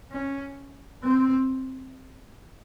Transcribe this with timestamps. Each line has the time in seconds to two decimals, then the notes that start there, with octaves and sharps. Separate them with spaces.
0.11 C#4
1.03 C4